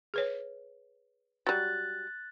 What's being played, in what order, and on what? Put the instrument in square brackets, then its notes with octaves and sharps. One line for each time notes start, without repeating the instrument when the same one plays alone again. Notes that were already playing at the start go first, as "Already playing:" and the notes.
[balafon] G#4 B4 C#5
[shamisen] F#3 G3 [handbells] F#6 A6